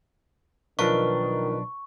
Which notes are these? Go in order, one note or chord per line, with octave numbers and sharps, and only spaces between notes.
B1 D#3 F3 D4 A#4 B4 C#6